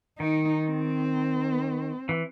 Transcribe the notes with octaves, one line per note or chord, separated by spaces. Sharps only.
D#3 D#4
C4
E3